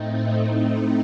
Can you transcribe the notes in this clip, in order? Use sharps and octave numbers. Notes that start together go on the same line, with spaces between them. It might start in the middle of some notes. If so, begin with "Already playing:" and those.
Already playing: A2 A3 C4 D#4